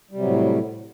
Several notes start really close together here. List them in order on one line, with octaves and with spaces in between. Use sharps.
G3 C3 F#3 A2